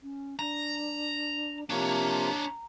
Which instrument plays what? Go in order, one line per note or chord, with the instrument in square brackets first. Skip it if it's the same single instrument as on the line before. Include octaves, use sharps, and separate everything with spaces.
[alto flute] C#4
[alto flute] D4 [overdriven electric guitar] A#5
[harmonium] C3 F3 A#3 [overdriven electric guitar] D4 C#5 [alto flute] A#5